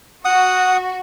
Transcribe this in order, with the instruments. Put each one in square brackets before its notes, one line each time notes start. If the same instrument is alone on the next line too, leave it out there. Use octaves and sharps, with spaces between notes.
[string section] F#4 [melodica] F#5 D#6